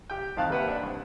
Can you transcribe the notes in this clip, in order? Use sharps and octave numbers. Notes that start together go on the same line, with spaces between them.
G4 G5
F2 D#3 F5 A5 F#6
A#3 G4 B4 E5 F#5
D4
C2